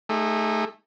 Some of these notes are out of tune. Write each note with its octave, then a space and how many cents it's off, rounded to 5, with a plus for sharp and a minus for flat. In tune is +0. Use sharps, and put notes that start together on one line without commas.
A3 +0 D#4 +0 G#4 -30